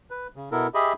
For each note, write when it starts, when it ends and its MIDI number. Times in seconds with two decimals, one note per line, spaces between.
0.10 0.27 71
0.36 0.49 49
0.52 0.67 47
0.52 0.67 59
0.52 0.67 64
0.52 0.67 69
0.52 0.67 70
0.74 0.93 67
0.74 0.93 68
0.74 0.93 75
0.74 0.93 76
0.74 0.93 83